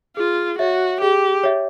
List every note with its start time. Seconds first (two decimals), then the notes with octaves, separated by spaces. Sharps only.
0.17 F4 G#4
0.59 F#4 C#5 E5
1.01 G4 G#4
1.43 C#5 E5